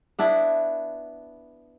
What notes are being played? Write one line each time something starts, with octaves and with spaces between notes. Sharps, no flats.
B3 D4 E4